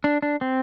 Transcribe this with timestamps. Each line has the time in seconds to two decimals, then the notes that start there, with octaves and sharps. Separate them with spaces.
0.04 D4
0.22 D4
0.41 C4